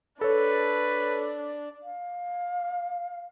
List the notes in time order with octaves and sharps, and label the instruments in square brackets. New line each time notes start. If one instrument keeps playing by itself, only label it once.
[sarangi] D4 [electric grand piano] A4 C#5 [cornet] B4
[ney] F5